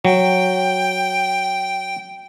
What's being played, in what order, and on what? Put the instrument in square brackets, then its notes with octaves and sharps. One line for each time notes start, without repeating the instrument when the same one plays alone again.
[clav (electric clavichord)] F#3 [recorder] G5